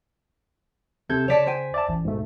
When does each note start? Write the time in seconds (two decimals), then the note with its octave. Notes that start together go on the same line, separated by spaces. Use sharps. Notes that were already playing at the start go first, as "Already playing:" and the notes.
1.09 C3 A4 G6 G#6
1.28 C#3 C#5 D5 A5 B6
1.46 C5 G5 G#5
1.74 D5 E5 A5
1.89 A1
2.05 G#2 B2 A3